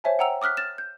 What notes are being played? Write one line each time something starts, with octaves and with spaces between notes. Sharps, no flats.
C5 C#5 E5 G#5 A5
F#5 G5 A#5 E6 F7
D6 D#6 F6 F#6 B6
F6 A6 E7
G6